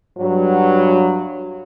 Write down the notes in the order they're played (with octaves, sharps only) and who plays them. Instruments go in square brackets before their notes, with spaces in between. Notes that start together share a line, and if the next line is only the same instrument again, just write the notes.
[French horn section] G2 F#3